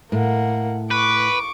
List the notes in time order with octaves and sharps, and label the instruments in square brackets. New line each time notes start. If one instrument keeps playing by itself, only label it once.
[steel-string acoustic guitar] A2 [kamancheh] A#3 F#5
[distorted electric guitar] B4 [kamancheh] C#6 D6